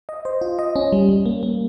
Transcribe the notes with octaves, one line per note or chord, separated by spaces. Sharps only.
D#5
C5
F4
D#5
C#4
G3
G3
A#3
A#3